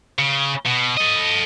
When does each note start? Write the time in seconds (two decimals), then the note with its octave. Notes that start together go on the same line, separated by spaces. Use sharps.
0.19 C#3
0.66 B2
0.97 A4 D#5